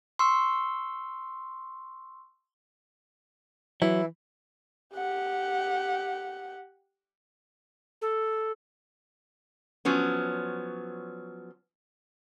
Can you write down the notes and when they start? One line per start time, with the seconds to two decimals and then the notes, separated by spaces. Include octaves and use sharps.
0.19 C6 C#6 E6
3.82 E3 F#3 E4
4.95 G4 F#5
8.02 A4
9.85 F3 F#3 B3 C#4